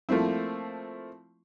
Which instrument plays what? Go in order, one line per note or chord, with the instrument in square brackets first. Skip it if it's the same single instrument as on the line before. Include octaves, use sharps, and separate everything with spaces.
[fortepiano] F3 A3 A#3 C4 E4